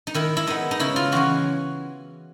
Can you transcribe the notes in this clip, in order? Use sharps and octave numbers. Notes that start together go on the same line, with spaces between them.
D#4
D#3 E4
E4
G#3 B3 D#4
D#4
C#3 E4
F4
E3 G#3 C#4 F#4